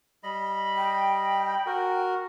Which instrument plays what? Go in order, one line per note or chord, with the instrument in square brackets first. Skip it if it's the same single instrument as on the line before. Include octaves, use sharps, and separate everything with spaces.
[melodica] G3 D#5 B5
[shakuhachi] G5
[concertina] F#4 A#4